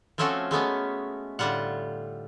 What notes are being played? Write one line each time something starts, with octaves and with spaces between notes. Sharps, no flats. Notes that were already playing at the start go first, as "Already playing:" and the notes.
F3 A3 C4 C#4 F#4 A4
G#3 A3 B3 C#4
A2 D3 G3 F4 F#5